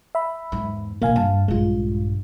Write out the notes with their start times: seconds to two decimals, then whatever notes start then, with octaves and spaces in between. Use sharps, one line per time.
0.15 E5 B5
0.52 E2 G#2
1.02 A#1 B2 A#3 F5 G#5
1.16 G2 F5 A5
1.48 A#1 G2 G#3 F4